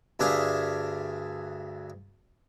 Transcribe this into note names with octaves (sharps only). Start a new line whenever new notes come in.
D2 G2 D4 G#4 E5 F5